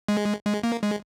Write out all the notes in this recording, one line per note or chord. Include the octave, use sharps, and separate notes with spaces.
G#3
G#3
A#3
G#3